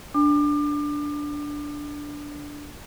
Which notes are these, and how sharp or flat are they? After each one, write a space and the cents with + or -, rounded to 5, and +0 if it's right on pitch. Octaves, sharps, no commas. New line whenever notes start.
D4 -5 D6 +35